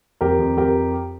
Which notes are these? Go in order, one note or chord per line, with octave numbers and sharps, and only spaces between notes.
F2 G4 A#4
F2
F2 G4 A#4